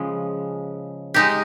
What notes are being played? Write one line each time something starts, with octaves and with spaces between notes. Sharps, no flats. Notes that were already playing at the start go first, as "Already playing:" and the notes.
Already playing: C#3 F3 G#3
G#3 D#4 G4